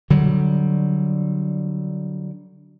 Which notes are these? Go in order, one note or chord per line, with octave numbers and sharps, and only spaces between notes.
D3 F#3 G3